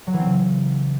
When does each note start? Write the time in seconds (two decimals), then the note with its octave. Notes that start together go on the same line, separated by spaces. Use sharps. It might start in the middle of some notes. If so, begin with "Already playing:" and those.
0.07 F#3
0.13 E3
0.20 C4
0.26 C#3